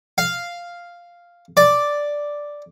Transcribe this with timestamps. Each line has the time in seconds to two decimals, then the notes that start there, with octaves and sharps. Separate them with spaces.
0.18 F5
1.57 D5